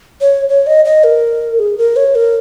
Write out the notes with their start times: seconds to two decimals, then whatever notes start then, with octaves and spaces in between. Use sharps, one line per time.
0.21 C#5
0.49 C#5
0.67 D#5
0.85 D#5
1.04 A#4
1.59 G#4
1.78 A#4
1.96 C#5
2.15 A#4